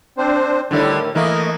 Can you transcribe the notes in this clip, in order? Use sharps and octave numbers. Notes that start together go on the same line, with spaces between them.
C4 D4 C5
A2 D3 D#3 G3 E4
E3 A3 A#3 D#5